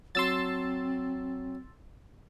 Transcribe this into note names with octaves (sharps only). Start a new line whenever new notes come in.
F#3 C4 A5 C6 E6 A6